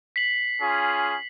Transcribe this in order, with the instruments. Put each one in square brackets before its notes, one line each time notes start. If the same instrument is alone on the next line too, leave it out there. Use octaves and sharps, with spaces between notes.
[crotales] B6 C7 F#7
[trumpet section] C#4 F4 G#4